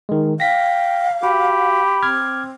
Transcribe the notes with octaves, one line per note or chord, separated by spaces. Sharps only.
D#3 G#3
F5 G5 A#6 B6
F#4 G4 B5
C4 D6 F6 G#6